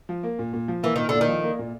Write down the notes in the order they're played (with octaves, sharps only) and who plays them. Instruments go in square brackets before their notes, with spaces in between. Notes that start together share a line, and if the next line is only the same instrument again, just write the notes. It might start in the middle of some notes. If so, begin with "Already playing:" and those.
[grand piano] F3
A#3
A#2
A#2
F3
[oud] E3 [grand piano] A#3
[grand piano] A#2 [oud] D#3
[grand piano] A#2 [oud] D3
[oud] D#3
[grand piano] F3
A#3
A#2